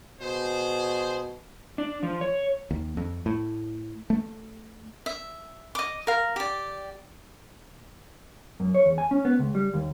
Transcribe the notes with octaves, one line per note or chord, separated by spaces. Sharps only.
B2 G#4 C5
D4
F3
C#5
D#2
F2
A2
A3
E5
D#5 D6
A#4 F5
G4 D5
F#2
C#5
E2
G#5
C#4
B3
C#2
G3
D#2